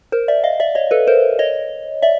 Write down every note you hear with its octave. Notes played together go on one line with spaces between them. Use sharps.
A#4 C5
D5 E5
D#5 F5
D5 E5
C#5 D#5
A4 B4
A#4 C5
C#5 D#5
D5 E5